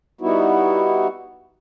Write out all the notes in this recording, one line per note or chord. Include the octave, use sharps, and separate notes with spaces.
G3 B3 D#4 E4 F#4